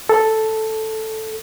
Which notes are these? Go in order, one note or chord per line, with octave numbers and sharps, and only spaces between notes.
A4